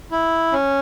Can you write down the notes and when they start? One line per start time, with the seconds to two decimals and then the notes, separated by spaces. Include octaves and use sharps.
0.11 E4
0.53 C#4